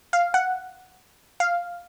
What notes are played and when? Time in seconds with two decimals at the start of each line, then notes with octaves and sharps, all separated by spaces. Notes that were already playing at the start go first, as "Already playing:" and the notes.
0.13 F5
0.34 F#5
1.40 F5